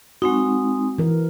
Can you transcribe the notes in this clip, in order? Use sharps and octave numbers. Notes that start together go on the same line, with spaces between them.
G#3 C4 D#4 F#4
E3 A#4